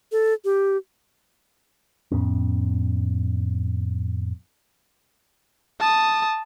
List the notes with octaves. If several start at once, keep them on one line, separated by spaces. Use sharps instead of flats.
A4
G4
F2 A2 B3 C#4
A5 D#6